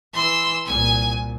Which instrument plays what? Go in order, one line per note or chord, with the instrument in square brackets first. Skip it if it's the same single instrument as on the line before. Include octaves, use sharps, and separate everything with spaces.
[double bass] E3 [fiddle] C6 E6
[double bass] C2 A#2 [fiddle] G#5